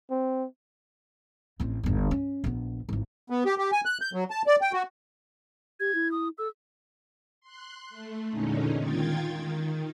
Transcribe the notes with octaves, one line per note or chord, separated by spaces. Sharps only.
C4
A1 C4
G1 E2
C#4
A#1 B3
G#1 E3
B3
G4
G4
G#5
F#6
G6
F#3
A5
D5
G5
F#4
G4 G#6
E4
D#6
A4 E6
C6 F#6
A3
E2 A#2 D3 G#3 C#4 D#4
D#3 F4 G5 G#6 A6
D#3